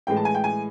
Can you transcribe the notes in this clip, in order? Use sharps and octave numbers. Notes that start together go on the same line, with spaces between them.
A2 E3 G#3 G5
A5
G#5
G5
G#5